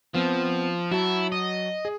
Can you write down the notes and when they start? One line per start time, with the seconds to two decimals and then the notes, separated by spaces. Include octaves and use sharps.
0.15 F3 B3 C4
0.91 F#3 E4 F#4 A5
1.32 D#5
1.85 G#4